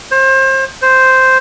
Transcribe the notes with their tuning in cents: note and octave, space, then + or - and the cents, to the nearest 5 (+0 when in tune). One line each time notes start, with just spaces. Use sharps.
C5 +30
C5 -5